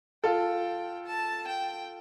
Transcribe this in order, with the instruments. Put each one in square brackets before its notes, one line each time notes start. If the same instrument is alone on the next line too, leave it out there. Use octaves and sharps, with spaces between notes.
[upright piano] F4 A4 [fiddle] G5
[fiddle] A5
G5